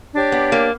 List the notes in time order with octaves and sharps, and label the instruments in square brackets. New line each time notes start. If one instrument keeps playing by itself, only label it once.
[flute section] D4 G4 C#5
[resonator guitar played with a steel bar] B3
A#3